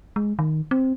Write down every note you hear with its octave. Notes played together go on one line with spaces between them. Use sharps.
G#3
D#3
C4